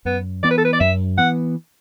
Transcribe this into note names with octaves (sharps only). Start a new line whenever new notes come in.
F#2 B3
E3 B3 D5
B4
A4
B4
D5
F#2 E5
E3 B3 F#5